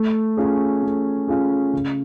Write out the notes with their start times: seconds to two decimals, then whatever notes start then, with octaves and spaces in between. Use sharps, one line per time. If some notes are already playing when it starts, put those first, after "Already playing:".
Already playing: A3
0.37 C#4 F4 G#4
0.83 A3
1.28 C#4 F4 G#4
1.73 C#3